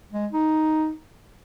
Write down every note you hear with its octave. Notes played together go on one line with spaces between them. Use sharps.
G#3
D#4